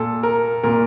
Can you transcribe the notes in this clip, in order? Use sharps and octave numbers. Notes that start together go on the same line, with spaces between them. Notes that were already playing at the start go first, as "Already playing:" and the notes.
Already playing: A#2 A4
A#4
A#2 A#4